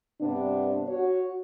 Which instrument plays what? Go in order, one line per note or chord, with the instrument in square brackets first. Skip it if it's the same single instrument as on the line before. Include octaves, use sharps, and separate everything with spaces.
[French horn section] G2 C3 B3 D4
F#4 C#5